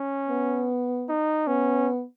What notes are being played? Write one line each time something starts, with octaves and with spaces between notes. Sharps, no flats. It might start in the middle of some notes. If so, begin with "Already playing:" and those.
Already playing: C#4
B3
D#4
B3 C#4